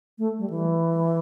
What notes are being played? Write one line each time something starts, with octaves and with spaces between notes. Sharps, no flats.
A3
G3
E3